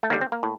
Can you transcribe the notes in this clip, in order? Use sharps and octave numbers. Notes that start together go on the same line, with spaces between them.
A3
D#2 D3 G3 A#3
C4
A#3
A2